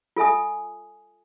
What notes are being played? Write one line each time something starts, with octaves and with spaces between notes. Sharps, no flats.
F4 A4 E5 G#5 D#6